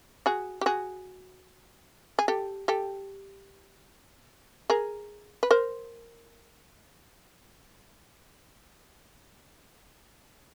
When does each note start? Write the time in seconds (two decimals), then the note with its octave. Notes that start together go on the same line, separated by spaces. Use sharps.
0.26 F#4 G#4
0.61 G4
0.66 F#4 G#4
2.19 G#4
2.28 G4 A4
2.68 G4 A4
4.70 G#4 A#4
5.43 B4
5.51 A#4 C5